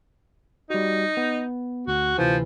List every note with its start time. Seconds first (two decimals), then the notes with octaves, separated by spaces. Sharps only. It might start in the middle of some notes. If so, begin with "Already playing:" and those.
0.70 G3 D#4 F#4
1.17 B3
1.87 D2 F#4
2.18 D2 C3 E3 F3